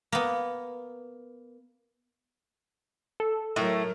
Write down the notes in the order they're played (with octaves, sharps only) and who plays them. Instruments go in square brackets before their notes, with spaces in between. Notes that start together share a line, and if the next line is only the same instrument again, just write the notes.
[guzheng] A#3 B3
[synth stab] A4
[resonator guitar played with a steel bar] A2 A3 [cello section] F#3 A#4